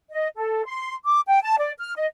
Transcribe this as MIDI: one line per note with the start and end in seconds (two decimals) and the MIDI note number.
0.10 0.28 75
0.36 0.64 69
0.65 0.94 84
1.06 1.20 86
1.27 1.42 79
1.42 1.58 81
1.58 1.72 74
1.79 1.93 89
1.95 2.06 75